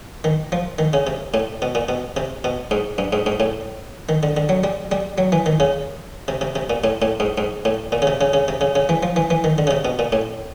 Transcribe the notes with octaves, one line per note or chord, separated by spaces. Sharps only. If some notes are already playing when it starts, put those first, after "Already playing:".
D#3
F3
D#3
C#3
C3
A2
B2
A#2
B2
C3
B2
G#2
G2
G#2
G#2
A2
D#3
D3
D3
F#3
G3
G3
F#3
E3
D#3
C#3
C3
C3
C3
A#2
A2
A2
G#2
G#2
A2
A#2
C#3
C3
C#3
C#3
C3
C#3
C#3
E3
F3
E3
E3
D#3
D3
C#3
C3
B2
A#2
A2